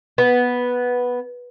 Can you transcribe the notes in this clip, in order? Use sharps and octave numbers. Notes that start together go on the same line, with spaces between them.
B3